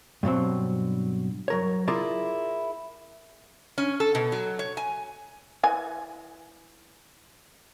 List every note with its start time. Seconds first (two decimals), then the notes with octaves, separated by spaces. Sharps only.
0.23 G2 B2 F#3 C4
1.48 F#3 A#4 C#5
1.88 E4 F4 G#4 A#4 D5
3.78 C#4
4.00 A4
4.15 B2
4.32 F#3
4.59 C#5
4.77 G#5
5.63 E3 G#5